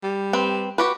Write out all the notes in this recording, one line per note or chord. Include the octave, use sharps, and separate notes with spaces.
G3
C4 B4
F#4 G4 B4